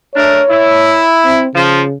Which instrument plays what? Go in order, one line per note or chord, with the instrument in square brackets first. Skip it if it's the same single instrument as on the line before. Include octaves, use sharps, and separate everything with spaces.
[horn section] A3 D4 A#4 [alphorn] C#5
[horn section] E4
[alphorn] C4
[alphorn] C#3 [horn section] F3